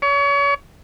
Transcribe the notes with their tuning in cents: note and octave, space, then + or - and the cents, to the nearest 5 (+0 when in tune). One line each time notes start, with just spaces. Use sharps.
C#5 +35